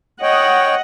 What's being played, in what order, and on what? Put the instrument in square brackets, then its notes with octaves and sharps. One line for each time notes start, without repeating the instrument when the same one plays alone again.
[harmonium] C#5 G5 [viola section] D#5 F#5